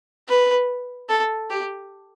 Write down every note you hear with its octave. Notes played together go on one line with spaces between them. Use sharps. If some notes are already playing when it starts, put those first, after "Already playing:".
B4
A4
G4